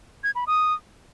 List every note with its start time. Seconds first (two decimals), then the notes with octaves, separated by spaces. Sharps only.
0.24 G#6
0.35 B5
0.47 D#6